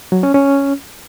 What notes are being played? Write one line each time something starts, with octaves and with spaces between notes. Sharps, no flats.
F#3
C#4
C#4